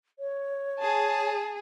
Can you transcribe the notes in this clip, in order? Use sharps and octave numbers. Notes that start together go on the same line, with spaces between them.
C#5
G#4 A5